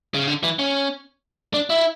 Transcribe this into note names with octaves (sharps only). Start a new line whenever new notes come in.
C#3
D3
E3
C#4
D4
E4